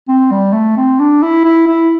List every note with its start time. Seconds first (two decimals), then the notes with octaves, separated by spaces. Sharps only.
0.08 C4
0.31 G3
0.53 A3
0.77 C4
1.00 D4
1.23 E4
1.44 E4
1.68 E4